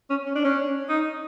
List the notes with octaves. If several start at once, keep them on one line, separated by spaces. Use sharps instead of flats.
C#4
C#4
D4
C#4
D#4